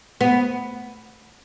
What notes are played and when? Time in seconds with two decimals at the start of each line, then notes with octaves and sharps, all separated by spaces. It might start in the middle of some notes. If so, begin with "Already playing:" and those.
0.21 B3